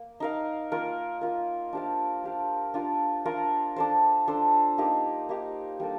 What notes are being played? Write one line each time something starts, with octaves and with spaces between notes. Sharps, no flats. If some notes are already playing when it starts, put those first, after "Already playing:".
Already playing: A#3
D#4 A#4 F5
A#3 F4 A#4
A#3 F4 A#4
D4 G4 C5 F5
D4 G4 C5 F5
D4 F4 A#4
D4 F4 A#4
D4 A4 C5
D4 A4 C5
A#3 D#4 G4
A#3 D#4 G4
G3 A#3 D4 A4